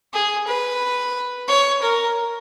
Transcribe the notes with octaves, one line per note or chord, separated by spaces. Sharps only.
G#4
B4
C#5
A#4